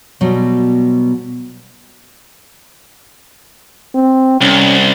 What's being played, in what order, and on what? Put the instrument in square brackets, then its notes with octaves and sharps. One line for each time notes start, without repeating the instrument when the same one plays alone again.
[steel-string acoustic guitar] B2 F#3 G3 B3
[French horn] C4
[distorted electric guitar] C2 [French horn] C#4